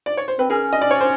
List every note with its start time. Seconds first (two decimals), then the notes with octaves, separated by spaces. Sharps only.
0.06 D5
0.17 C#5
0.28 C5
0.39 C4 B4
0.50 C#4 G#4 A#4
0.73 D#5
0.82 D5
0.91 C#5
1.01 C5